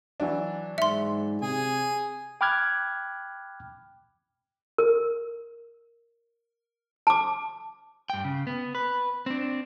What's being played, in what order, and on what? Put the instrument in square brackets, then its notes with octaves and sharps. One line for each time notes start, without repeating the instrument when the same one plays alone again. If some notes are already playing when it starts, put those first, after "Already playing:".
[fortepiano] E3 F#3 D4
[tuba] G#2 [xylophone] E5 C6
[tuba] C3 [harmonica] G#4 G#5
[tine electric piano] G5 B5 D6 F6 F#6 G#6
[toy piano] A#4
A5 D6
[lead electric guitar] G2 G5
C#3
B3
B4
C4 D4